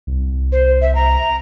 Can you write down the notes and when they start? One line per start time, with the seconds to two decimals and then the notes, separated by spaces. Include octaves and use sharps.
0.07 C2
0.52 C5
0.81 E5
0.95 A#5